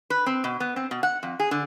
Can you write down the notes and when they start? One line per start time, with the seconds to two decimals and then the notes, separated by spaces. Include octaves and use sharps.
0.10 B4
0.26 C4
0.44 B2
0.60 B3
0.76 C4
0.91 B2
1.03 F#5
1.23 F2
1.40 G#4
1.51 D3